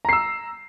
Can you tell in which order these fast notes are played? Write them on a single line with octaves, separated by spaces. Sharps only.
A#5 C7 E6